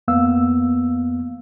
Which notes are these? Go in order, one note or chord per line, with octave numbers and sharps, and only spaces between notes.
F2 A#3 B3 F5 E6